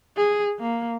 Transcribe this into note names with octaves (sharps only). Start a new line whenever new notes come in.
G#4
A#3